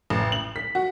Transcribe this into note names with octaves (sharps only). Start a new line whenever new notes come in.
A1
F#7
B6
F#4